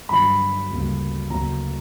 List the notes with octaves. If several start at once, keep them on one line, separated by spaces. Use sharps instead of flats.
G2 D3 F#3 B5
D2 C#3 G3 A#3
D2 C#3 F#3 A#3 A#5